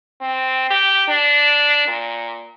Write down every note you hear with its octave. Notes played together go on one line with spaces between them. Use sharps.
C4
G4
D4
A#2